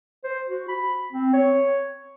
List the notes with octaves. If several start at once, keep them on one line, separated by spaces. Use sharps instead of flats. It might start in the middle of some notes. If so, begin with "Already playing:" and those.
C5
F#4
B5
C4
C#5